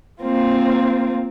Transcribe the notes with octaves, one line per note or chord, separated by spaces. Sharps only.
A#3 C4 F4